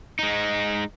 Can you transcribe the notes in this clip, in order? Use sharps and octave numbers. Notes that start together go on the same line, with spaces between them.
G#3 D#4